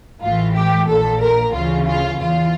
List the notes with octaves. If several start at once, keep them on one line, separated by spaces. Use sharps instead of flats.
A1 A2 E3 F4
G4
A#1 A#2 A4
A#4
D2 C#3 E3 F4
F4
E2 E3 F4